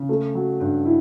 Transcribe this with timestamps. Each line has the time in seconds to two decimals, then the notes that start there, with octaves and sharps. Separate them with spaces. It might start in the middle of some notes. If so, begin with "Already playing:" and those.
Already playing: C#3
0.09 A3
0.35 F#3
0.60 G2
0.85 E4